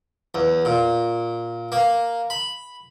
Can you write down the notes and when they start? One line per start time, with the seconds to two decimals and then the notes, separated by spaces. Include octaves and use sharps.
0.34 E2
0.65 A#2
1.72 A#3
2.30 B5